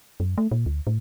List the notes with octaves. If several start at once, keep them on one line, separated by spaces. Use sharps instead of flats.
F#2
A3
A#2
D2
A2